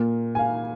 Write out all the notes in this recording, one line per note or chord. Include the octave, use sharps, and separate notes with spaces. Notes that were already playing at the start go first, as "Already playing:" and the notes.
Already playing: A#2 A#3
G#5
F5